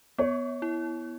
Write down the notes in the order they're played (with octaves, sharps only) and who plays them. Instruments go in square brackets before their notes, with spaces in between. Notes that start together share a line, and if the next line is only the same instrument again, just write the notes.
[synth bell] B3 [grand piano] C#5
[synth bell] E4